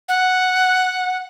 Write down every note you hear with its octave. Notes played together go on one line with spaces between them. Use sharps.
F#5